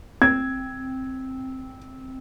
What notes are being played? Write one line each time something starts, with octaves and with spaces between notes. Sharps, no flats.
C4 G#6